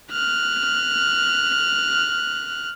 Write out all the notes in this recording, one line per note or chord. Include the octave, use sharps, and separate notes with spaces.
F6 F#6